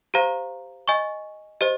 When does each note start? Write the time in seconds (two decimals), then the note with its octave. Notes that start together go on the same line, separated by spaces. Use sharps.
0.14 G4 C5 F5 A#5
0.88 D#5 G#5 C#6
1.61 G4 C5 D#5